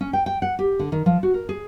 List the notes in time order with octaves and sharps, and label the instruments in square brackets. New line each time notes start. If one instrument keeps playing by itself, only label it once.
[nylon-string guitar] C#4
G5
G5
F#5
G4
D3
D#3
F3
F#4
A#4
G#4